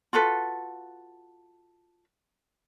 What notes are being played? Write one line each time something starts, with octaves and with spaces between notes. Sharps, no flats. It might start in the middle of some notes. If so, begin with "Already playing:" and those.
F4 F#4 A4 B4